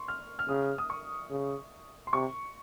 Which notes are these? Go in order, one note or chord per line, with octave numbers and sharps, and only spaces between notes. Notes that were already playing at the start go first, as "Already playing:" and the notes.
Already playing: C6 C#6
F6
F6
C#3 D#6
D#6
C#6
C#3
C6
C3 C#6